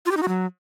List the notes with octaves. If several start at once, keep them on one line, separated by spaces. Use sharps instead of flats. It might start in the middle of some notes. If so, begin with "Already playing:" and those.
F4
G4
D#4
F#4
F#3